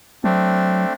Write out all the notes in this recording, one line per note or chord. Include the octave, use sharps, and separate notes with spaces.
F#3 A3 C4 D4